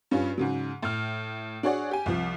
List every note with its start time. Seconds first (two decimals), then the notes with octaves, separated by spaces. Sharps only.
0.11 G2 C#4 F4
0.38 G#2 C#3 F#3
0.83 A2 F6
1.63 D4 F#4 G#4 C#5 D5 F#5
1.91 G4 G#5
2.06 C2 F3